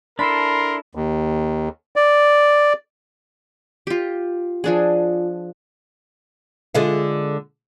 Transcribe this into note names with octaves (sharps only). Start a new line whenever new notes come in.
D4 E4 A4 A#4 B5 C6
D#2
D5
F4 G4
F3 D4 G#4
D3 G#3 F4